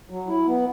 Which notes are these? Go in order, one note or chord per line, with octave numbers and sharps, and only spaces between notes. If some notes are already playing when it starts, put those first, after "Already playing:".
F#3
E4
B3